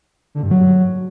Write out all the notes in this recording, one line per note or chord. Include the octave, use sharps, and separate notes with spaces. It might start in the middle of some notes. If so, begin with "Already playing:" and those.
D3
G2
F#3